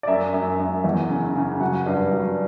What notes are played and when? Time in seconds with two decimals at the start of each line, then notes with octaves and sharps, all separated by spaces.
0.03 D5
0.07 F#2 E5
0.34 F#2
0.59 F#2
0.84 E2
1.09 C#3
1.36 C#3
1.61 F#3 F#5
1.86 G2
2.13 F#3